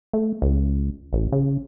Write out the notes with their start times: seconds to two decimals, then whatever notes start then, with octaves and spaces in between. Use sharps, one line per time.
0.13 A3
0.42 C#2
1.13 A1
1.32 C#3